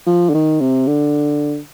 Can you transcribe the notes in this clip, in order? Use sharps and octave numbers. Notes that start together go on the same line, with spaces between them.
F3
D3
D#3
C3
D3